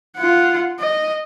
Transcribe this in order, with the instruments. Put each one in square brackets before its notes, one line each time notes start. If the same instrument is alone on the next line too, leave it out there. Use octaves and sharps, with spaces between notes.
[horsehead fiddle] F4 F#5
D#5